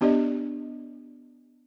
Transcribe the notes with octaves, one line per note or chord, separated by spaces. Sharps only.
B3 D4 G4 D5 D#5